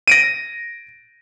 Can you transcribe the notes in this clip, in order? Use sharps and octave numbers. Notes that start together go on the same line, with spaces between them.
A#6 D7 D#7